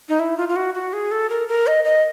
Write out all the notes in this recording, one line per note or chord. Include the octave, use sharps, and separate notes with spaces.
D#4
E4
F4
F4
F#4
F#4
G#4
A4
A#4
A#4
D#5
D#5